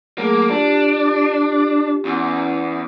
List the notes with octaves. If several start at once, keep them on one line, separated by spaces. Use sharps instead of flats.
F#3 A3 A#3 G#4
D4 F4 G4
E2 C#4 E4 F#5